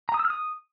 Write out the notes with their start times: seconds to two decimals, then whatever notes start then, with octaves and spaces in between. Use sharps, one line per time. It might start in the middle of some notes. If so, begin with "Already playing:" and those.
0.09 A#5
0.14 D#6
0.19 E6
0.25 F6
0.30 D#6